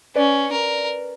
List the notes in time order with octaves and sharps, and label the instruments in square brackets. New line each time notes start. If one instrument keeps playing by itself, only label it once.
[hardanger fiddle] C#4 [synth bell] B4 D5
[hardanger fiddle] A#4